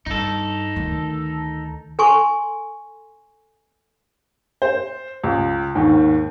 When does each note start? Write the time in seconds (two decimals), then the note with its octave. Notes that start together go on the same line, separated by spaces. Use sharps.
0.06 G2 D#4 A4
0.76 D2 D#3
1.99 A4 G#5 C6 C#6
4.62 C5
5.24 C#2
5.75 D#2 G#2 D#3